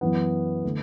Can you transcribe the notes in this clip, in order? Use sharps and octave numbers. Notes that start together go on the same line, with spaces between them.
F#2 E3 B3
D3 A3